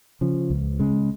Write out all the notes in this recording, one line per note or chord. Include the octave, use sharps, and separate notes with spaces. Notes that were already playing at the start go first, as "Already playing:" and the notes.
C#3 F3
C#2
C#3 G#3